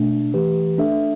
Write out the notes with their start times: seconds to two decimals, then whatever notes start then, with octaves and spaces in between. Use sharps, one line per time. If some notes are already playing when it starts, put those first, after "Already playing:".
Already playing: B2 A3 D4
0.34 E3 A3 G4 B4
0.78 A3 D4 A4 E5